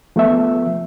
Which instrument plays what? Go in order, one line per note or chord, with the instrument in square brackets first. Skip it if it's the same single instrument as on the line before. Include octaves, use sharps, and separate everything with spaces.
[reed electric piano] F3 A3 B3 E5